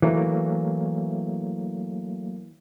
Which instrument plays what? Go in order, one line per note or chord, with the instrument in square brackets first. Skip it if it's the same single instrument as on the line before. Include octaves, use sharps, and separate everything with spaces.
[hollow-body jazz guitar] E3 [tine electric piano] F#3 A3 A#3